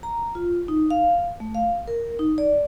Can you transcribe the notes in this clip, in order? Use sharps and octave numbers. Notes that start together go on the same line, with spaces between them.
A#5
F4
D#4
F5
A3
F5
A#4
D#4
D5